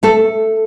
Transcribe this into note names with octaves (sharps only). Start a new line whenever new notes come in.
A3 A4